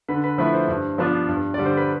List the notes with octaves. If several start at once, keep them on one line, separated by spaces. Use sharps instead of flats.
D3 B4
B4
F3 A3 E4 B4
C5
G2
F3 B3 D4 F4
G2
D3 G3 D5
C5
B4